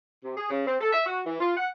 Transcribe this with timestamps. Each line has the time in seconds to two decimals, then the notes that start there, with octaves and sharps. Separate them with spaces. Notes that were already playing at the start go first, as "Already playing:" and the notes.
0.24 C3
0.37 G#4
0.50 C#3
0.66 C4
0.81 A4
0.93 E5
1.06 F#4
1.26 E3
1.40 F4
1.57 F#5